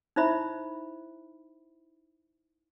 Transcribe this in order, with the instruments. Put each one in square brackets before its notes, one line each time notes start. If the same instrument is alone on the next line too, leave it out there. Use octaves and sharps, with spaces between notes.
[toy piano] D#4 E4 C5 E5 B5